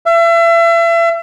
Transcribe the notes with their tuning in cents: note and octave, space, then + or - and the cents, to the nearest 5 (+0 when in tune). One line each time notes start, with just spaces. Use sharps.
E5 +35